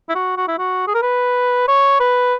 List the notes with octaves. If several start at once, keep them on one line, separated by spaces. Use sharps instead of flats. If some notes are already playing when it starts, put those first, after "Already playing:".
E4
F#4
F#4
E4
F#4
G#4
A#4
B4
C#5
B4